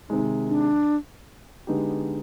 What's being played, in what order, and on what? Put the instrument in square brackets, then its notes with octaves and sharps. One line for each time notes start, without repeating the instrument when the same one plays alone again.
[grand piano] C3 D#3 G#3 [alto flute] D#4
[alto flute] D4
[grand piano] D3 G#3 B3 D#4 G4